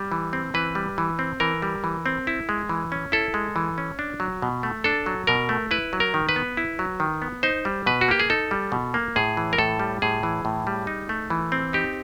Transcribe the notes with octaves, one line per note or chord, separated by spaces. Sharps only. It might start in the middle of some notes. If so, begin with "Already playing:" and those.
Already playing: G3
E3
C4
E3 B4
G3
E3
C4
E3 A#4
G3
E3
C4
E4
G#3
E3
C#4
E4 A4
G#3
E3
C#4
D4
F#3
B2
A3
D4 A4
F#3
B2 A#4
A3
E4 B4
F#3
A#4
D#3
B4
B3
E4
F#3
D#3
B3
D#4 C5
G3
B2 B4
F#4
A#3 G4
G#4
D#4 A4
G3
B2
A#3
A2 G#4
E3
A#4
A2 A4
G3
A2 G#4
E3
A2
G3
D#4
A3
E3
C4
D#4 G4